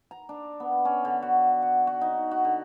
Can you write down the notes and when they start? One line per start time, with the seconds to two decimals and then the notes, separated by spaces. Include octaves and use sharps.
0.11 A#5
0.29 D4
0.60 B3
0.85 C#4
1.05 D3
1.22 F#4
1.62 F#5
1.87 F#4
2.01 D#4
2.31 F#4
2.45 D3